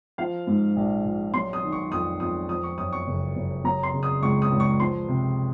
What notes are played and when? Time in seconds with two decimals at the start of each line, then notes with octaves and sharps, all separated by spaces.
0.18 F3 F5
0.47 G#2
0.76 A#1
1.05 A#1
1.33 F#3 C6
1.53 D#6
1.63 D#3
1.72 C#6
1.91 F2 D#6
2.20 F2 D#6
2.49 F3 D#6
2.63 C#6
2.78 F#2 D#6
2.93 C#6
3.07 F#1
3.36 F#1
3.64 F#3 A#5
3.83 C6
3.93 C#3
4.03 D#6
4.22 C#2 C#6
4.42 D#6
4.51 C#2
4.60 C#6
4.80 F3 C6
5.08 C3